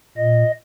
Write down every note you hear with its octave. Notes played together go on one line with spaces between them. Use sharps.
A#2 D#5